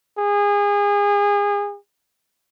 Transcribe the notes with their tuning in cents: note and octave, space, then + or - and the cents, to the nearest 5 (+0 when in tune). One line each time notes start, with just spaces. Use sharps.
G#4 -30